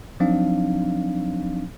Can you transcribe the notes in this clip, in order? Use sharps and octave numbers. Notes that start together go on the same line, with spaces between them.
F3 F#3 C4 D4 D#4 F5